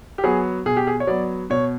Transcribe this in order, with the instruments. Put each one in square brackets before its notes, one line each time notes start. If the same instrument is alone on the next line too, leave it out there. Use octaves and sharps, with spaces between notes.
[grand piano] G4
F#3 B3 G#4
B2 G#4
G4
G#4
C#5
F#3 B3 D5
B2 C#5